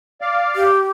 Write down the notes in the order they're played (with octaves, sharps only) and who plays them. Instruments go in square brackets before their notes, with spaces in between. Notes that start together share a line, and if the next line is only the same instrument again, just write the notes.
[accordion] D5 F5
[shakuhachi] G4